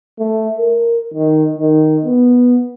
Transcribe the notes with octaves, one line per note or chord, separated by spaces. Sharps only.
A3
A#4
D#3
D#3
B3